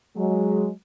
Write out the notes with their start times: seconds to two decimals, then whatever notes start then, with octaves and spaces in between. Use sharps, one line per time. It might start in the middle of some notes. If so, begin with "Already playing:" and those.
0.17 F#3 G#3